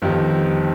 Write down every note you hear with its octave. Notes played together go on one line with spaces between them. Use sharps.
G1 F2 D#3 G3